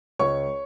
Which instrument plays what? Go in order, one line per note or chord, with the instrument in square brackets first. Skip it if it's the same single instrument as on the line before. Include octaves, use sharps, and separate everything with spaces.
[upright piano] C#2 C#5 C#6